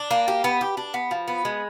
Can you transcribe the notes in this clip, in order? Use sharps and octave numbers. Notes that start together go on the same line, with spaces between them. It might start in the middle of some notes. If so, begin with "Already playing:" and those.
Already playing: D4
A#3
G4
B3
G4
D4
B3
F3
B3
G#3